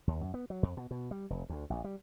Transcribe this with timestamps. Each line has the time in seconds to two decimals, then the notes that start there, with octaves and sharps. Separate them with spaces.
0.07 D#2
0.21 F#2
0.34 B3
0.50 F#3
0.63 F2
0.77 B2
0.91 B2
1.11 G3
1.30 F1
1.49 D2
1.70 A#1
1.84 G3